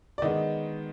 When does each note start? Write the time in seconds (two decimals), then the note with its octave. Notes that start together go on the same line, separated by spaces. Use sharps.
0.18 D5
0.22 D#3 G#3 B3 D#5